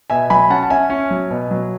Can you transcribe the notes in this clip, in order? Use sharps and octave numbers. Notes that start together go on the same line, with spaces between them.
B2 E5 G#5
F#3 G#5 B5
C#4 F#5 A5
A5
C#4 E5 G#5
C#4
F#3
B2
F#3